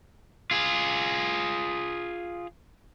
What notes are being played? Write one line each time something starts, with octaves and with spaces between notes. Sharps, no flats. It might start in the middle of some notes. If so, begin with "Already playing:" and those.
F4 G#4